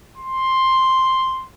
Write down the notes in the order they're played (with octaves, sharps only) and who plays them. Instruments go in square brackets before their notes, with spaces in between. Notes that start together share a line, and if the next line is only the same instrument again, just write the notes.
[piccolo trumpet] C6